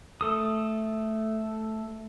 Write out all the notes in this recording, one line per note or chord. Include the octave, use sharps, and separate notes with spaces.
A3 A4 D#6